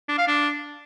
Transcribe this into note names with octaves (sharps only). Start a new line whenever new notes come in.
D4
F5
D4